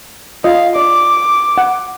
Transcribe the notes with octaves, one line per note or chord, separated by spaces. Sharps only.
F4 D#5 F5
D5 D6
F#5